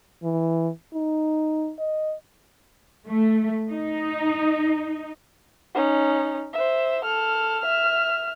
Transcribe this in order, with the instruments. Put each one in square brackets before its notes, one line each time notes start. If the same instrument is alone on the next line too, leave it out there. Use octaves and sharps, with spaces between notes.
[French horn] E3
D#4
D#5
[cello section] A3
D#4
[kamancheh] C#4 D#4
C5 E5
A4 F6
E5 F6